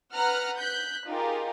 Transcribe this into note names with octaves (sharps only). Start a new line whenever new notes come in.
B4 F#5 A#5 F6 F#6
F#6 G6 B6
D#4 F4 G4 G#4 A#4